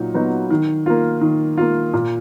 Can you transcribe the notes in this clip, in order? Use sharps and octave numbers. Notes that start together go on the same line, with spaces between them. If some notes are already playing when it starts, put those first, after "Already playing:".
Already playing: A#2 F#3 D#4
F#3 B3 D#4 F#4
D#3
A#3 F4
D#3
A#3 F4
A#2